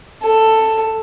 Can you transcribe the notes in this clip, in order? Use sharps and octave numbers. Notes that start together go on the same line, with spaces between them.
A4